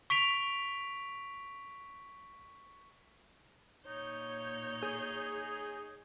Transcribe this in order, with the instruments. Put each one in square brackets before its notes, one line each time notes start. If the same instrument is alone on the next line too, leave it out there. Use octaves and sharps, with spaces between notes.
[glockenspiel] C#6 B6 D7 F7
[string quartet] A#2 C#5 G6 [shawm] D#4
[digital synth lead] G#4